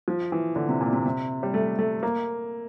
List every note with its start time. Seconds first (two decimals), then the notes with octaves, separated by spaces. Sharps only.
0.08 F3
0.32 E3
0.56 D3
0.68 C3
0.81 A#2
0.93 C3
1.06 C3
1.43 G3
1.54 A3
1.79 A3
2.03 A#3